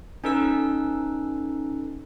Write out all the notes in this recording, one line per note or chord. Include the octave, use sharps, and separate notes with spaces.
C#4 D#4 A4 B4 E6